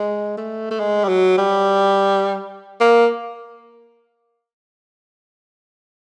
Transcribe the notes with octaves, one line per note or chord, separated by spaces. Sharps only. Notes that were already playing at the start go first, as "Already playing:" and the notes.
Already playing: G#3
A3
A3
G#3
G3
F#3
G3
A#3